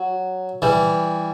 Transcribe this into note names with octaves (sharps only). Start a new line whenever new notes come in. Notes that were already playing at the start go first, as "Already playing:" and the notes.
Already playing: F#3
E3 G3